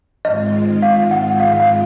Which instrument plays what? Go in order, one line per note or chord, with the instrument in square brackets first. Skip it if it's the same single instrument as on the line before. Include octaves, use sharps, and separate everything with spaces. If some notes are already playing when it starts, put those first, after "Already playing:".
[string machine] G#2 D#3 G#3 C4 F4 [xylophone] D#5
[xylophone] F5
F#5
F5
F5